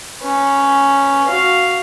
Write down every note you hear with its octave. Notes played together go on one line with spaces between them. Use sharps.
C#4 B4
F#4 F5